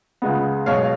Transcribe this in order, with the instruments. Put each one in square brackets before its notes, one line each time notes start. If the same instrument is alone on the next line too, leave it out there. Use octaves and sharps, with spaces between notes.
[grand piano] C#2 C#3 G#3 B3
B1 B2 G#3 C#5 F5